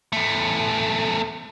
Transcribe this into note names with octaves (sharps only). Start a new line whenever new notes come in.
E2 A3